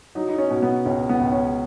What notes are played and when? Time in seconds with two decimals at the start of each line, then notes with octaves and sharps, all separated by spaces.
0.15 F#3 D#4
0.29 D#4
0.38 C#4
0.50 B2
0.62 B3
0.85 C#2 C#4
1.09 B3
1.20 C#2
1.32 C#4